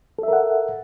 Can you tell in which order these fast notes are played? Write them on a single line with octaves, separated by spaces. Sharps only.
A4 E5 A#4 F#5